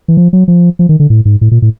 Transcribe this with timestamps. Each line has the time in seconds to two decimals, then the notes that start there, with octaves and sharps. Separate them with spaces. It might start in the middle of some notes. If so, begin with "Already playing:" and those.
0.08 E3
0.17 F3
0.33 F#3
0.48 F3
0.79 F3
0.89 D#3
1.00 D3
1.10 A2
1.25 G#2
1.41 A2
1.51 A#2
1.62 A2